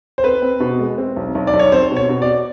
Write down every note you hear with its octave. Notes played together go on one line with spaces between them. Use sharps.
C5
C4 B4
C4
B2
G#3
C4
B1
B1
D5
B1
C#5
C4 C5
B2
C#5
B2
D5